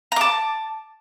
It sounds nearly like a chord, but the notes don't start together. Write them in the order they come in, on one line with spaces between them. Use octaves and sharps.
A#5 D6 A5